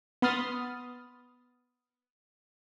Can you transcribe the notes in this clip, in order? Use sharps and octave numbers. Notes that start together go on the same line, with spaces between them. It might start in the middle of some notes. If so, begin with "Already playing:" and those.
B3 B5 C6 D#6 F6 A6